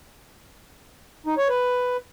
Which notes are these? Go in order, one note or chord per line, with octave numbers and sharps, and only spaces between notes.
D#4
C#5
B4